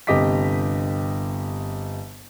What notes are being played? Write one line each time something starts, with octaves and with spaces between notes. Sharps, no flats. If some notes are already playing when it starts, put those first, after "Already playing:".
G1 C3 G4 D#5 D6 B6